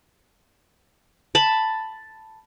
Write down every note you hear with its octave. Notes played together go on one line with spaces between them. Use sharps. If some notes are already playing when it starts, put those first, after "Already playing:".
A5 B5